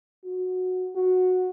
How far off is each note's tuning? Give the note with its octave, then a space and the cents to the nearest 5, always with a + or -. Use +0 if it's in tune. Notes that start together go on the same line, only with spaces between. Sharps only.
F#4 -10
F#4 -10